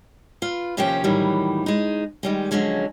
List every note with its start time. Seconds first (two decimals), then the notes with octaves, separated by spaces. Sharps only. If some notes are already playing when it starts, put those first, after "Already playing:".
0.42 F4 B4
0.77 D#2 C3 F3 C#4 G4 G5
1.04 A2 D#3 E3 F#3 G3
1.66 G#3 D#4
2.23 D#3 G3 G#3
2.51 D3 F3 F#3 G#3 C#4